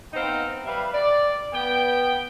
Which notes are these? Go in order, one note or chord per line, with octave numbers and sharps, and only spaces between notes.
B3 C4 D#4 F5 G5 A#5
G3 B4 E5 F5
D5
B3 G5